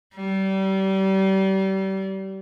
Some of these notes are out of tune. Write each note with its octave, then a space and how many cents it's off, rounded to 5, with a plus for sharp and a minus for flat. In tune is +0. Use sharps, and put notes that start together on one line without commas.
G3 -30